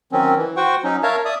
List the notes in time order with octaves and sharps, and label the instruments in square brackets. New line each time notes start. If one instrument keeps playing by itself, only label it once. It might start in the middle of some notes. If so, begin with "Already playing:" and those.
[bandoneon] D#3 F#3 C4 C#4
E3
F#4 C5 F#5 G5 C#6
F#3 C#4 D#4
A#4 C#5 E5 F5 A5
D5 E5 D#6